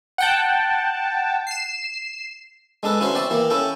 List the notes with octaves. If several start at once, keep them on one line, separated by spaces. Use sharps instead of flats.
F#5 G5 A5
C7 E7
G#3 D4 A4 B4
C#4 E4 F#4 B4 C5
C4 D5 E5 A5
E3 A#3 E4 G4
C#4 E4 A4 G5